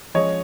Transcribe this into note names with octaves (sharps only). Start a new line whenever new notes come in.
F3 G#3 C#4 C#5 D#5